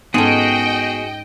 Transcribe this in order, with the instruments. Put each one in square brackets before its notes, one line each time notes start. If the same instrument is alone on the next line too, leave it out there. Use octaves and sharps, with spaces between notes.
[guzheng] G#2 C#4 [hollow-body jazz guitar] B3 A4 [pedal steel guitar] F#4 G#4 [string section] D#5 G5